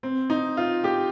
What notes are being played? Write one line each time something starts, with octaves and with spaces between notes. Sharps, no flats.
C4
D#4
F4
G4